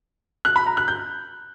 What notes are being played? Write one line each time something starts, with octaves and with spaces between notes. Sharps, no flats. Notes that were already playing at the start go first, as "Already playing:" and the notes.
F#6
B5
A#5
F#6
G6